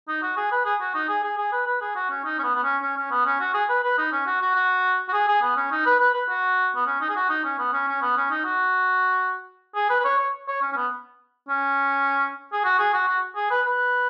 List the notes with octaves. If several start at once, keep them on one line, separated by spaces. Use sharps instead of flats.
D#4
F#4
G#4
B4
G#4
F#4
D#4
G#4
G#4
G#4
B4
B4
G#4
F#4
C#4
D#4
C#4
B3
B3
C#4
C#4
C#4
B3
C#4
F#4
G#4
B4
B4
D#4
C#4
F#4
F#4
F#4
F#4
G#4
G#4
B3
C#4
D#4
B4
B4
B4
F#4
B3
C#4
D#4
G#4
F#4
D#4
C#4
B3
C#4
C#4
B3
C#4
D#4
F#4
G#4
B4
B4
C#5
C#5
C#5
C#4
C#4
B3
C#4
G#4
F#4
G#4
F#4
F#4
G#4
B4
B4